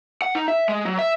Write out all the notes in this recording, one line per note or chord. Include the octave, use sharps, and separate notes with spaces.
F#5
D#4
E5
G#3
F#3
E5